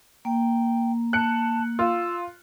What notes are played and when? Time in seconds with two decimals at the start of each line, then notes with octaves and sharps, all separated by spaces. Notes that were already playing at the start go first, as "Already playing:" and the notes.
0.25 A#3 G5
1.13 A5 F#6 C#7
1.79 F4 E6